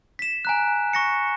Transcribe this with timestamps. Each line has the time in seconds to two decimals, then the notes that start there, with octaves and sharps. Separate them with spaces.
0.19 B6 E7
0.45 G#5 A#5 F#6
0.93 C#6 A#6 C#7